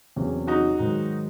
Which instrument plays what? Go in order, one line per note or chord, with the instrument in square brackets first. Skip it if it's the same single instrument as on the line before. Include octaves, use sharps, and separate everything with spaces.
[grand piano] E2 C3 F#3 C#4 G#4
[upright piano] D#4 F#4
[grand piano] G#2 D#3 F#3